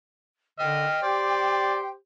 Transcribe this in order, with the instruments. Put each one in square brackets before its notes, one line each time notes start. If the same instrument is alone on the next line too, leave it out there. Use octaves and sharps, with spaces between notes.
[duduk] D3 [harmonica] D#5 F6 [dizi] G5
[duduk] G4 [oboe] C5 [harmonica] D5